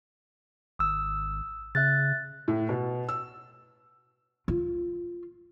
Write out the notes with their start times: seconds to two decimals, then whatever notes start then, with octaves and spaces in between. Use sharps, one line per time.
0.79 G#1 D#6 E6
1.75 C#3 E5 F#6 A6
2.48 A2
2.69 B2
3.09 E6
4.48 F4